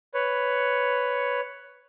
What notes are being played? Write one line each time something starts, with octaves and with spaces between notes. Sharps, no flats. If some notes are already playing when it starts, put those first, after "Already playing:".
B4 C#5